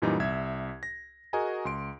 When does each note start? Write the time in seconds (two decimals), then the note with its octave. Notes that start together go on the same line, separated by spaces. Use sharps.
0.02 F#2 A#2 E3 G3 D#4
0.20 C2 E5 G#6
0.83 A#6
1.33 F#4 G#4 A#4 D#5 G#5 A#5
1.65 C#2 C6 D7